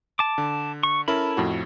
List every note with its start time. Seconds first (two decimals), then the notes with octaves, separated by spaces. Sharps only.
0.19 A5 D6
0.38 D3
0.83 C#6
1.08 C#4 E4 A4 A#4 B5
1.37 F2 A2 F#4